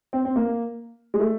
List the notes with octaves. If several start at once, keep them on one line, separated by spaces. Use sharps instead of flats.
C4
C4
A#3
G#3
A3